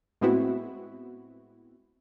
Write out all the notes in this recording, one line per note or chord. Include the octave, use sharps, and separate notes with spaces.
A2 G#3 B3 C4 E4 F#4